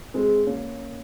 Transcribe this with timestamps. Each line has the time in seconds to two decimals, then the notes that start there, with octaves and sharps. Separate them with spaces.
0.14 G#3 C4
0.47 A#3 C#4